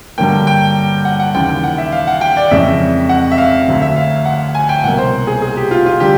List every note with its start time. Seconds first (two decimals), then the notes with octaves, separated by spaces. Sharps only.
0.18 G2 D3 F#3 A#3 G5
0.47 G5
1.05 F#5
1.20 F#5
1.34 D#2 C#3 E3 G5
1.49 G5
1.63 F#5
1.78 E5
1.92 F5
2.07 F#5
2.21 G5
2.37 D5
2.51 F2 C#3 E3 G#3 C#4 E5
3.09 F#5
3.32 E5
3.38 F5
3.67 D2 D3 F#3
3.82 E5
3.96 F5
4.25 F#5
4.55 G#5
4.69 G5
4.84 C2 B2 F#3 A#3 F#5
4.98 C5
5.27 G#4
5.42 G#4
5.57 G4
5.71 F4
5.86 F4
6.00 D3 G3 G4